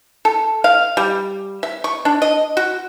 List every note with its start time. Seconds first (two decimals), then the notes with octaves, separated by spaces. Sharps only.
0.25 A4
0.64 F5
0.97 G3
1.63 E5
1.84 C#6
2.05 D4
2.22 D#5
2.57 F#4